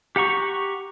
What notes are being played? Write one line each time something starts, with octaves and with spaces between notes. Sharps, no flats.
G4 F#5 A#5 C#6